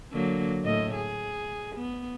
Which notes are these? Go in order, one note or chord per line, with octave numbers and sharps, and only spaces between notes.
D3 F#3 A#3
A2 D#5
G#4
B3